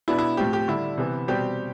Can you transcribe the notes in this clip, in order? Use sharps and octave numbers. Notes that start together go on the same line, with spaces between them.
B2 B3 D4 E4
E4
A2 F3 C4 G4
G4
D3 G3 D4 E4
C3 E3 B3
B2 G3 C4 G4